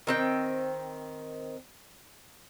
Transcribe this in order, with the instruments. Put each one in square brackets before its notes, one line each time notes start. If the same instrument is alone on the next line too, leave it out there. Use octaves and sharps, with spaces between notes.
[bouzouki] D#3 C4 G5